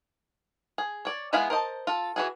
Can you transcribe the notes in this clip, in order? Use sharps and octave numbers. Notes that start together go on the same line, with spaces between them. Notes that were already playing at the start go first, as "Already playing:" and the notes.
G#4
C#5 D5
G#3 B3 E4 G#4 F5
A#4 C5 D#5 A5
F4 A4
E3 F#4 G#4